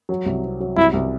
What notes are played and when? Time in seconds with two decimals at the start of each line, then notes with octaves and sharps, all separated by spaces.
0.09 F#3
0.26 C2
0.44 C4
0.60 F#3
0.77 C2 E4
0.93 C2